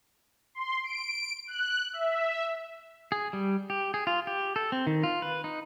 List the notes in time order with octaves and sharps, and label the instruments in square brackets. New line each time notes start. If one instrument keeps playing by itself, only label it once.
[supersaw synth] C6
D7
F#6
E5
[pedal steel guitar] G#4
G3
G4
G#4
F4
G4
A4
C4
D#3
F4
B4
D#4